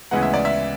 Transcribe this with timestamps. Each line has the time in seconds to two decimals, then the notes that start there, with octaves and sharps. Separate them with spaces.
0.11 D2 C#3 E3 G#3 B3 F#5
0.23 E5
0.34 D5
0.45 E5